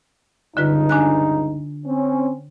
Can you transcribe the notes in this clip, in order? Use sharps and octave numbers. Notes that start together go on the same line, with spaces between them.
C#2 G2 D3 D#4 F4 B4
D4 G#5 F#6
C4 C#4